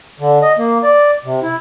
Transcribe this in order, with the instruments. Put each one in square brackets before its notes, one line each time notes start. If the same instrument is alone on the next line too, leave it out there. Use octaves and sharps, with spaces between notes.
[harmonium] D3
D#5
A#3
D5
C3
E4